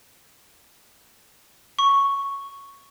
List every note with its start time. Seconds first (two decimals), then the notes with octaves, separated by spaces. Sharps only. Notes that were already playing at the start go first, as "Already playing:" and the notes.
1.79 C#6